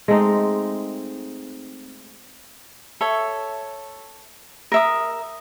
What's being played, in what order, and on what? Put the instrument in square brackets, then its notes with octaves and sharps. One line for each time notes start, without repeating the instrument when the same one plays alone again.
[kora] G#3 A3 C4 D#4
[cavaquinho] A4 C#5 E5
A#4 E5 D#6